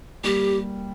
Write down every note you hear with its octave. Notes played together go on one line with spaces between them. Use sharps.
G3 A#3 G4